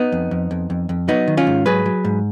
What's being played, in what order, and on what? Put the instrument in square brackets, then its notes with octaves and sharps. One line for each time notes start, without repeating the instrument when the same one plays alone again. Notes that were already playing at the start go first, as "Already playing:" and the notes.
Already playing: [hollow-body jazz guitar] B3 D#4
F2
F2
F2
F2
F2
F#3 B3 D#4
D#3
C#4 F4
G#2
F#3 G#4 B4
F#3
G#2